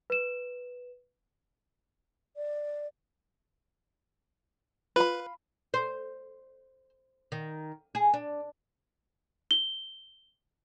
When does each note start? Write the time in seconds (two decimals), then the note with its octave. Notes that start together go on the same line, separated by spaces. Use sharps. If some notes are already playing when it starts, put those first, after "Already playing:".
0.10 B4 E7
2.36 D5
4.96 F4 B4 B5
5.74 C5
7.32 D#3
7.95 G#4
8.14 D4
9.51 G7